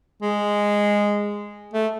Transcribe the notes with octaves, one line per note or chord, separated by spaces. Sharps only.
G#3
A3